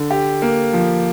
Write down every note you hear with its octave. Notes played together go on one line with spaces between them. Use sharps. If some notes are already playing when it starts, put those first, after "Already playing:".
Already playing: D3
G4
A#3
F3